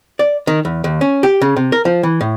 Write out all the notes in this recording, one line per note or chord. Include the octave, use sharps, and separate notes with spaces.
D5
D#3
E2
D#2
C#4
G4
C#3
C3
A#4
F3
E3
A2